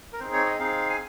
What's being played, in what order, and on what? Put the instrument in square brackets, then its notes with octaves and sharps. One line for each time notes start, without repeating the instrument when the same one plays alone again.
[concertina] A#4
C4 D#4 G#4 C5
C#5
D#5
C4 D#4 G#4 F5
G#5